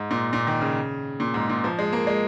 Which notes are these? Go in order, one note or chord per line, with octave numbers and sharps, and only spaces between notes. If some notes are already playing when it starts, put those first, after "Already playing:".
Already playing: G#2
A#2
A#2
D#3
C#3
A#2
G#2
A#2
F3
G#3
A#3
G#3